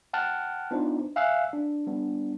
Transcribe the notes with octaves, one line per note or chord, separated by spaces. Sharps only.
F#5 G5 A5 F6 F#6
B3 D4 D#4 F4 C5
E5 F5 G#5 E6 F#6
D4
G3 B3 D4